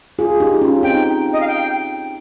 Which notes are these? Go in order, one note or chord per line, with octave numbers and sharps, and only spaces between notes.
F4 G#4
D#4 G4
C#4 F4
C4 D#4 G5
D#5
F5
G5